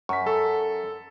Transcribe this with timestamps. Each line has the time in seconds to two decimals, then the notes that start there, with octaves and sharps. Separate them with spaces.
0.09 F#2 C#6 B6
0.26 A4